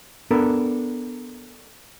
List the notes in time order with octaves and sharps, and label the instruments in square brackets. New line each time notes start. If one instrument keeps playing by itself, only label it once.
[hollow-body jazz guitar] B3 D4 A4 A#4